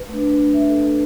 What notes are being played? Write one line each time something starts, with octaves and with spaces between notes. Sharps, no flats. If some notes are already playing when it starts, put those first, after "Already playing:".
Already playing: B4
A3 D4
E5
A4
B4